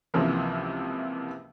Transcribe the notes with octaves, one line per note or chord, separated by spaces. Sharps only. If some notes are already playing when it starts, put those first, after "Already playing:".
C#2 C3 E3 F3 A#3